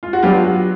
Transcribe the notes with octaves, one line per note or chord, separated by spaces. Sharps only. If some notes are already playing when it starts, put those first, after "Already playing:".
F4
F#4
F#3 B3 D4 F4 G4
F#4